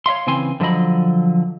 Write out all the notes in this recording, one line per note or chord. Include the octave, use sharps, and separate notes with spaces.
C#5 E5 F5 C6
C#3 E3 C4 G#5 C6
D3 F3 F#3 D#5 B5